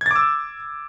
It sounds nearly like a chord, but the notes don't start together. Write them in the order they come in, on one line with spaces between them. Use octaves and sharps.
G#6 A6 D6 E6